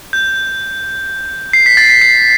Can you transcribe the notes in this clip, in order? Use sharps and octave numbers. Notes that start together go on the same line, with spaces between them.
G6
C7
B6
A6
B6
C7